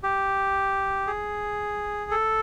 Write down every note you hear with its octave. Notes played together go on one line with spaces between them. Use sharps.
G4
G#4
A4